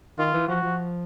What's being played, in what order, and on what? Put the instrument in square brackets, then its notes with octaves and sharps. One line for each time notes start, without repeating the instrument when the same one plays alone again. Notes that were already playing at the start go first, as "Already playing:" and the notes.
[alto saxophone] D#3 [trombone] F4
[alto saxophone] E3
[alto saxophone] F3 [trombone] F#4
[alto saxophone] F3